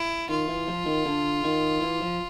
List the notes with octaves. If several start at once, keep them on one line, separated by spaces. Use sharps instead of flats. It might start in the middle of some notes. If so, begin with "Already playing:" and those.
Already playing: E4
D#3 F4
E3
F3
D#3
D3
D#3
E3
F3